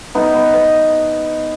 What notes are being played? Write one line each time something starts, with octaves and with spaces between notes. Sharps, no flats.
B3 D#4
B3
B3